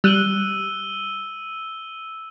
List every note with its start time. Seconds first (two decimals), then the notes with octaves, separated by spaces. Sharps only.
0.04 G3 E6 F#6 D#7 G7